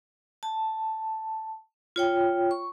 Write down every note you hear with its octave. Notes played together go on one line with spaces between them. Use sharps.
A5
F4 C#5 G5
C#6